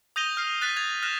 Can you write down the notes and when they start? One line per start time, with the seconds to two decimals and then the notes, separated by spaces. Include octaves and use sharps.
0.16 D#6 G6 A#6 D#7 F7 G7
0.37 F6 C7
0.62 F#6 A6 B6 D#7
0.77 G#6 A6 F7
1.02 F6 F#6 A#6 E7